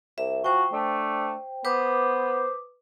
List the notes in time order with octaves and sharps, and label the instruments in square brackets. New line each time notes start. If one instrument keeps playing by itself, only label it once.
[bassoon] C2 [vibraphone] E5
[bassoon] F3 [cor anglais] F#4 [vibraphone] C5 G5
[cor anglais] A3 [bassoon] D4
[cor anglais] B3 [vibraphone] B4 D6 D#6 [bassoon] C5